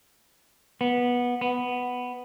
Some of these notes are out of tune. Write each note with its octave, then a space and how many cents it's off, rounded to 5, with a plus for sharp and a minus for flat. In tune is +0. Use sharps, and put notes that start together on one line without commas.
B3 -15
B3 +5